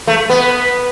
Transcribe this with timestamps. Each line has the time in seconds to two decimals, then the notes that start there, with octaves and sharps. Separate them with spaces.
0.07 A3
0.30 B3